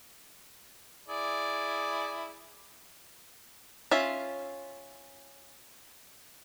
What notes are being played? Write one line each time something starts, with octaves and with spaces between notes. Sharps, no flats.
E4 G#4 D5
C#4 F4 E5